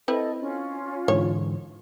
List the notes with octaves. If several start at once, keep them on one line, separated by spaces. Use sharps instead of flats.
C4 E4 A4 B4 D#5
C#4 F4
G#2 D3 E3 C#5